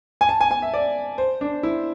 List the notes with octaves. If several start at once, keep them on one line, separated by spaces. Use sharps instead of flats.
G#5
A5
G#5
G#5
E5
D5
C5
D4
E4